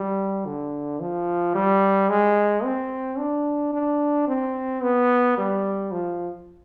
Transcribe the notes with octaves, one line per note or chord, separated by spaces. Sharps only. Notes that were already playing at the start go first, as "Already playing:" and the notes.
Already playing: G3
D3
F3
G3
G#3
C4
D4
D4
C4
B3
G3
F3